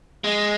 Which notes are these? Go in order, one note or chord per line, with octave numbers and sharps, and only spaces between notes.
G#3